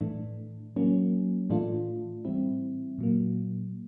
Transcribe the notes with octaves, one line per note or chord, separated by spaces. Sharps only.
A2 E3 A3 D4
F#3 A#3 C#4
A2 E3 A3 D4 F4
A2 E3 G3 C4 E4
A#2 F#3 A#3